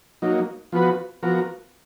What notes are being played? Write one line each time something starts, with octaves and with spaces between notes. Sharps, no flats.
F#3 A#3 D#4
F3 B3 F#4 B4
F3 B3 F#4 A#4